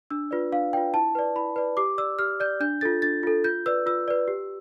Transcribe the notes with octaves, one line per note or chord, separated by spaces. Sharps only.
D4 E6
F4 B4 D5
D4 F5
F4 B4 D5 G5
E4 A5
B4 D5
E4 B5
B4 D5
G4 D6
D5 E6
G4 F6
D5 G6
D4 G6
F4 A4 A6
D4 A6
F4 A4
F4 G6
B4 D5 E6
F4 E6
B4 D5
G4